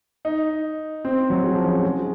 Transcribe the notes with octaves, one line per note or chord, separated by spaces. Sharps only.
D#4
C4
F#3
G#3
F3
C#4
G#3